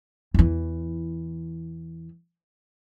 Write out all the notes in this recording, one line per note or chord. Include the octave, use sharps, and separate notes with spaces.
E2 E3